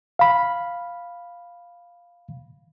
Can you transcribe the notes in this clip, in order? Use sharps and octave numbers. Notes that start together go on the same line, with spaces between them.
F5 B5